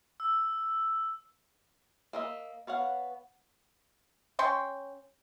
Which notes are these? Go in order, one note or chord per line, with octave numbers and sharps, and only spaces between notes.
E6
A#3 D#5 E5
B3 C#5 F5 F#5
C#4 G5 C6